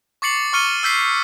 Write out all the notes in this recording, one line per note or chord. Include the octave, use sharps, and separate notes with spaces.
C#6 D6 A6 C7 C#7 F#7
C#6 F6 C#7 D#7 G7
E6 G6 B6 C7